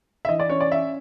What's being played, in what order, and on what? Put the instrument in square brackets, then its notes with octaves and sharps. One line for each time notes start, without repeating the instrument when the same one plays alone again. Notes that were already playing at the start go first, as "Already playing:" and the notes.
[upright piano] E5
E3 D#5
D5
C#4 C#5
D5
C#4 E5